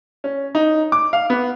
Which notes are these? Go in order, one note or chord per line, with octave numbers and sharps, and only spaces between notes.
C#4
D#4
D6
F5
B3